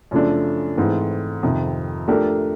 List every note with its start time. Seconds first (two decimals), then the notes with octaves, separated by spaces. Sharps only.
0.11 F#2 C#3 F3 A3 D4
0.77 G#2 E3 A3 C4 E4
1.43 F2 C3 D#3
2.08 F3 A3 D4 G4 A#4